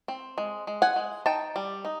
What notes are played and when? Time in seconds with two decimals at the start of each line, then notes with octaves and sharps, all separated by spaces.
0.08 C4
0.38 G#3
0.67 G#3
0.82 F#5 G#5
0.96 G#3
1.26 D#4 G5 A5
1.56 G3
1.85 D#4